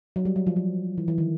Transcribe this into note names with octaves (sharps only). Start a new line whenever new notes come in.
F#3
G3
F#3
F3
F#3
E3
E3
D#3